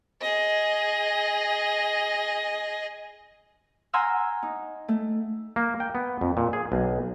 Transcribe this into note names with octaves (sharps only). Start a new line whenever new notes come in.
G#4 D#5
F#5 G#5 A#5 C6 E6 F6
D#4
A3
A#3
G5
B3
F2
A#2
G#4
B1